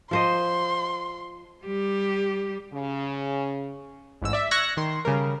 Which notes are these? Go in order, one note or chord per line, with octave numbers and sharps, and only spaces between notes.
F3 C5 D#5 C6
G3 G4
C#3
A1 G#2 E6
D5 E5
C#6 E6 F#6 G#6 A#6 C#7
D#3 C6
C#3 G3 A#4